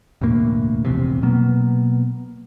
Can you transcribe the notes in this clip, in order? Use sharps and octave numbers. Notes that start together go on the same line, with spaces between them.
E1 D2 A2 A#3
F1 A#1 E2 C3
B2 F#3 A#3 B3